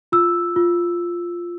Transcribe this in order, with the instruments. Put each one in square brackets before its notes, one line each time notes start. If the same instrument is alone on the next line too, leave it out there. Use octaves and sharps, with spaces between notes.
[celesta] F4 E6
F4